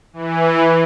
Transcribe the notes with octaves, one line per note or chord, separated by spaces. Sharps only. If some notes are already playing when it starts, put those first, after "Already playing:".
E3